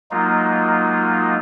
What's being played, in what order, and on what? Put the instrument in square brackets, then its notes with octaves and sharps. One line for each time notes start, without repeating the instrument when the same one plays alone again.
[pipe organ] F#3 G#3 A#3 D#4 F4